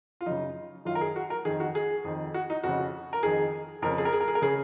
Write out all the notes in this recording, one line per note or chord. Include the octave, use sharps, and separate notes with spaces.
F4
F#2 C#3 D#4
F#2 D#3 F4
A#4
G#4
F#4
A#4
F2 D#3 G#4
F#4
G#4
F2 D#3
F#4
D#4
F2 C#3 F#4
A#4
F2 D#3 G#4
F2 C#3 A#4
G#4
A#4
G#4
A#4
G#4
A#4
C#3 G#4